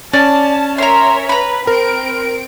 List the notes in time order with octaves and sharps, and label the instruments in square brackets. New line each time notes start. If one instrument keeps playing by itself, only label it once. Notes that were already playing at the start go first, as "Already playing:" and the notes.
[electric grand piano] C#4 [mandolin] D5 [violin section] A5
[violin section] A#4 C#5 E5 [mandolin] A#5 C6
[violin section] B4 [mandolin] A#5 B5
[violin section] C4 D7 [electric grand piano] A#4